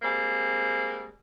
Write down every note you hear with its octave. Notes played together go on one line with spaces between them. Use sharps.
G3 G#3 A#3 C4